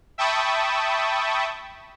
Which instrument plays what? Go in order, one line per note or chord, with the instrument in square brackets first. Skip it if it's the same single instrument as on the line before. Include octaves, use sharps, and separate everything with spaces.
[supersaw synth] E5 G5 A5 B5 C#6 D#6